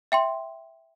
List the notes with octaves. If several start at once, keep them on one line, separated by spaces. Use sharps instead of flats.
E5 G5 C6